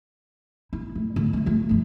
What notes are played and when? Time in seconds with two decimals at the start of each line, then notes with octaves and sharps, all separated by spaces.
0.73 E4
0.95 A3
1.16 D3
1.33 G3 A3
1.46 A3 F4
1.69 G1 F3